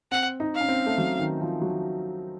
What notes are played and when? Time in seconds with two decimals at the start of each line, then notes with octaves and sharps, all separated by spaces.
0.11 C4 F#5
0.40 D#4
0.55 F5
0.61 C#4
0.69 C4
0.86 A3
0.98 F#3
1.19 D#3
1.41 F3
1.62 F#3